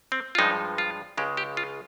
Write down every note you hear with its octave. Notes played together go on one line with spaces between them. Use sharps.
C4
F4
G2 F3 G#3 D#4
F4
C#2 C#3 G#3 G4
G4
F4